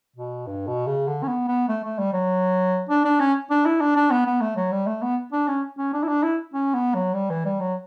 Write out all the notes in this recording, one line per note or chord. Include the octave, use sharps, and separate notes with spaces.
B2
G2
B2
C#3
D3
C#4
B3
B3
A3
A3
G3
F#3
D4
D4
C#4
D4
E4
D4
D4
B3
B3
A3
F#3
G3
A3
B3
D4
C#4
C#4
D4
E4
D4
E4
C#4
B3
F#3
G3
E3
G3
F#3